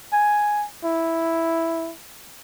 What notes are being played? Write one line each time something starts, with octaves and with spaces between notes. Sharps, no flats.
G#5
E4